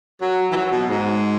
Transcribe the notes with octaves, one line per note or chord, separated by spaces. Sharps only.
F#3
E3
F#3
B2
G#2